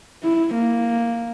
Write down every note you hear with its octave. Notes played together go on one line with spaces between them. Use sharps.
E4
A#3